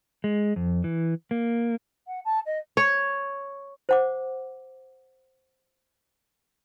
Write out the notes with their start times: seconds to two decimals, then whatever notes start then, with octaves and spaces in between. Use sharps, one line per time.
0.24 G#3
0.56 F2
0.84 E3
1.31 A#3
2.07 F#5
2.25 A5
2.46 D#5
2.77 C#5
3.89 C5 F#5 D6